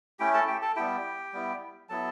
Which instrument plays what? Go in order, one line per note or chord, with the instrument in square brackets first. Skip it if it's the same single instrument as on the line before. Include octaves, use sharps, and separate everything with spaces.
[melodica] A3 C#4 E4 G4 G5
A4 A5
G4 G5
A4 A5
G3 B3 E4 G4 G5
G3 B3 E4
F#3 B3 E4 A4 A5